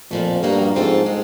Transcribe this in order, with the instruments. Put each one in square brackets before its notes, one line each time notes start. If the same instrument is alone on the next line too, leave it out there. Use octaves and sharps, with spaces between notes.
[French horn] F2 [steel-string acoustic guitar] A#2 F3 A3
[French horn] G2 [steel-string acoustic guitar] G3 A#3 D#4 F#4
[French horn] G#2 [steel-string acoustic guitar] F3 A3 C4 F4 A4
[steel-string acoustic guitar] G#3